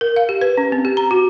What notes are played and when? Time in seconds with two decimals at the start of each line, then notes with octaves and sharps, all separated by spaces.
0.01 A#4
0.16 F5
0.29 G4
0.41 B4
0.57 C#4
0.72 C4
0.85 G4
0.97 A#5
1.11 F#4